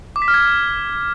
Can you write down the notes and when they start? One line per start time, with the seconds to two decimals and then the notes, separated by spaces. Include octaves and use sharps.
0.16 D6
0.22 B6
0.28 F6
0.34 G#6